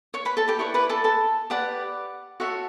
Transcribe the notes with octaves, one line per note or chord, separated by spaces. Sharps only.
C#5 C#6
B4 B5
A4 A5
G4 G5
E4 B4 C#5 D5 C#6
B4 B5
A4 A5
A4 A5
G4 B4 D5 F#5
F#4 A4 C#5 E5